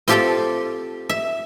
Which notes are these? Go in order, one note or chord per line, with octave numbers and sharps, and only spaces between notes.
C4 F4 G4 A4 F5 G5
E5